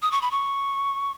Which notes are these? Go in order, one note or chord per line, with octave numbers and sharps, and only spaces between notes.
D#6
C#6
B5
C#6